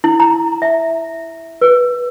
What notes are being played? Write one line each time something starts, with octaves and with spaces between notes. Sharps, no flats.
E4
A#5
E5
B4